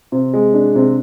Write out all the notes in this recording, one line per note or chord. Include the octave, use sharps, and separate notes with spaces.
C3
G#3
D4
C3